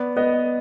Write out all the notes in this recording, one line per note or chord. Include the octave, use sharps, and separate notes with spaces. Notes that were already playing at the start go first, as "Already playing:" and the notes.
Already playing: B3 D5
B3 D#5